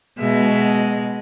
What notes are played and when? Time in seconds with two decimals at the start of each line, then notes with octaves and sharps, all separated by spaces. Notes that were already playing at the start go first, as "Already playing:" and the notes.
0.19 B2 G#3 E5